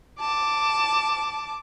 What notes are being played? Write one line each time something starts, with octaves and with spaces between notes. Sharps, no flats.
A5 D6